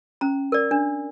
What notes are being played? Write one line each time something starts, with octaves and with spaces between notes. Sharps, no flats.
C#4 A#5
A#4 D5
D4